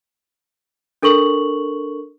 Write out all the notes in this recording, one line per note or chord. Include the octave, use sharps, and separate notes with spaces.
D4 A4 A#4 C#6 F#7